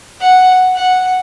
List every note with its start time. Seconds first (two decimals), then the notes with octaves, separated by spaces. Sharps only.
0.21 F#5
0.75 F#5